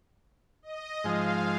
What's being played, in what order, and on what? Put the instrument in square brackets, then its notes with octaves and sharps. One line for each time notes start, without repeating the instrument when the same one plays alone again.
[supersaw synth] D#5
[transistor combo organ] G#2 F3 G#3 [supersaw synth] F5